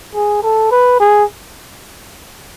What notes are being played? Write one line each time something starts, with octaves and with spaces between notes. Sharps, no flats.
G#4
A4
B4
G#4